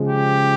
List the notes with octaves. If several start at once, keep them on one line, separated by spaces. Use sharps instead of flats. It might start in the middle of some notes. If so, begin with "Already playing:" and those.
Already playing: C#3 F3 G#3
G4